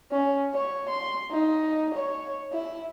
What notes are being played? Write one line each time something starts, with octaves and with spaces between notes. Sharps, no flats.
C#4
C#5
C6
D#4
C#5
E4